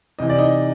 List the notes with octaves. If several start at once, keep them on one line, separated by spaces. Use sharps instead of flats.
C3 E3 D#5
D5
D#4 D#5